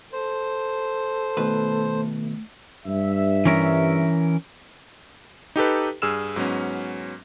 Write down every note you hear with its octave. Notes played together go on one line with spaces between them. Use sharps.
A4 C5
B2 D#3 A3 B4
G2 E5
E3 C#4 A#4
D#4 G4 A4 B4
G2 G#4 E6 F6 E7
G#2 F#3 B3 C#4